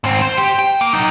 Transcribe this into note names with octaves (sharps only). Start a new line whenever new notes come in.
G#2 C4
C5
G4
G5
A#3
F#3 D#4